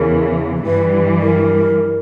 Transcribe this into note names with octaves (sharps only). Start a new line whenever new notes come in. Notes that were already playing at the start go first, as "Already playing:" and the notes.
Already playing: E2 C#3 E3 A#4
G2 E3 G3 B4
A#4